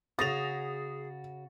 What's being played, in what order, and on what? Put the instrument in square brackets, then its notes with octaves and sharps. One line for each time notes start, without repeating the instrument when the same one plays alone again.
[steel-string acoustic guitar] C#3 F#4 [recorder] G#4 [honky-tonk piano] D#6 A#6 F7 [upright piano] A6